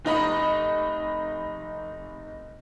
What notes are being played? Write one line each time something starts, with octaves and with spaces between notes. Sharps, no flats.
F1 D#4 D#5 B5